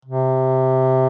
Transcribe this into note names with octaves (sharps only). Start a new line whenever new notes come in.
C3